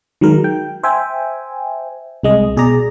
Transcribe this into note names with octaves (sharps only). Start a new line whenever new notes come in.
D#3 F#3 G#3 A#4
G5
C5 E5 G5 G#5
C2 G#3 D#5
B2 G#4 D5 A#5